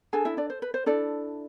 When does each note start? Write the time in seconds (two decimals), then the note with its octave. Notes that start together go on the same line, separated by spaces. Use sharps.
0.13 D4 G#4 A4 G#5
0.25 E4 E5
0.37 D4 D5
0.50 C5
0.62 B4
0.74 C5
0.86 D4 E4 A4 D5